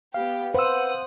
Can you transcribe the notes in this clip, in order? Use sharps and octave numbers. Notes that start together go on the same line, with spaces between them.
B3 G4 F5
B4 C5 F#5 D#6 E6